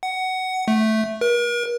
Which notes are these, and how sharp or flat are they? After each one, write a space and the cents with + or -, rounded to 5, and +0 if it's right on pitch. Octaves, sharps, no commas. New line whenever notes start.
F#5 +15
A3 -5
A#4 +45